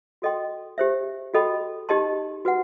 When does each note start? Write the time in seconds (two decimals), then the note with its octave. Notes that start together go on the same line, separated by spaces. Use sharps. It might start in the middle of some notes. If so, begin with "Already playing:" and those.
0.22 F#4 A4 D#5 G5 C6
0.78 G4 C5 E5
1.34 F#4 A4 D#5 G5 B5
1.89 D#4 G4 D#5 A5 C6
2.45 F#4 B4 F#5